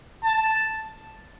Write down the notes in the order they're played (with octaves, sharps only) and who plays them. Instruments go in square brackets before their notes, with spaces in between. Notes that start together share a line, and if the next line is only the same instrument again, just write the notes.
[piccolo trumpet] A5